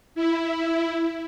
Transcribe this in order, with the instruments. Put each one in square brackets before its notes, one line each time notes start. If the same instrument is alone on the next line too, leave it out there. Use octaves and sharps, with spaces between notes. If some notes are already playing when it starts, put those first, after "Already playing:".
[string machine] E4